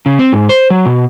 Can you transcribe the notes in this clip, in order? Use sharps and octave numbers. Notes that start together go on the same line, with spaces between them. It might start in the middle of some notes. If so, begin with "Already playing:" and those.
C#3
C4
G#2
C5
F#3
B2